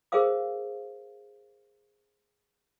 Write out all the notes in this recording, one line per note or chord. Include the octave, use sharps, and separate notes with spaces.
G#4 A#4 C5 F5 D#6